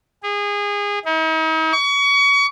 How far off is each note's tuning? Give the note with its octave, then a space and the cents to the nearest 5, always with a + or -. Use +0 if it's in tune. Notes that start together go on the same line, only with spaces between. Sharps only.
G#4 -25
D#4 +45
C#6 +30